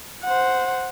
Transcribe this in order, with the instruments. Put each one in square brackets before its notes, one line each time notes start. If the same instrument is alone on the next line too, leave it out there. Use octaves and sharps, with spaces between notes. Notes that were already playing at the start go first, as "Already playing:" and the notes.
[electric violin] C5 F#5